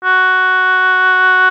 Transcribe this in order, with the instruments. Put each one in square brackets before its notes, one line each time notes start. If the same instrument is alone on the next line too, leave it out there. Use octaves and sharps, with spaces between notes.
[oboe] F#4